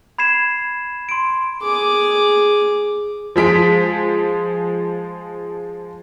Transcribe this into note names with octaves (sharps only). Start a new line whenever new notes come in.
B5 G#6 C7 E7
C6 D7
G#4 D6
F3 G#3 B6 D7